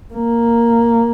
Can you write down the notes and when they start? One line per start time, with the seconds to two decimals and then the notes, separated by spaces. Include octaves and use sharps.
0.14 A#3